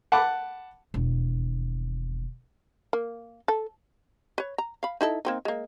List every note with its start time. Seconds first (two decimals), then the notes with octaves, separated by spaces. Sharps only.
0.12 F#5 A5 B5 D6
0.94 E1 D#2
2.93 A#3
3.48 A4
4.38 B4 C#5
4.58 A#5
4.83 F5 B5
5.01 D#4 E4 A4
5.25 A#3 C4 D#4
5.45 G#3 A#3